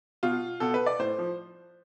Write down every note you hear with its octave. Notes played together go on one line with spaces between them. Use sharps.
B2 F4
B2 A4
B4
D5
A2 C5
F3